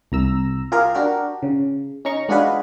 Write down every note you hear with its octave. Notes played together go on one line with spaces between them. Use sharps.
C2 A#5 E6
F4 G4 G#4 A#4
D4 F#4 G4 A#4
C#3
C#4 D#4 A#5 C#6
G#3 D4 F4 F#4 G#4 B4